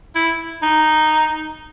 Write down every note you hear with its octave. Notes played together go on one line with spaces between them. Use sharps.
E4
D#4